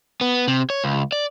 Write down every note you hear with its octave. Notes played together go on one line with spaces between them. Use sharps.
B3
C3
C#5
C#2
D5